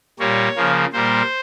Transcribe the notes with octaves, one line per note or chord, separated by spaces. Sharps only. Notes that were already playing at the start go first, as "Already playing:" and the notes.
A#2 G3 A#3 C#5
C#3 F3 A#3
A#2 G3 A#3 C5